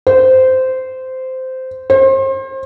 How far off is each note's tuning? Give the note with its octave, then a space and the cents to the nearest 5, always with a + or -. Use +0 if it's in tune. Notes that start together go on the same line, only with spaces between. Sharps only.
C5 -15
C5 +35